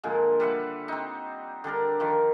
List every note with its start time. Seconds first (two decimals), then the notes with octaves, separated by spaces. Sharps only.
0.04 A#2 D3 F3 G#3
0.40 G3 B4 E5 F#5
0.88 C4 D#4
1.64 D3 G3 D4 A#4
2.00 D#3 F3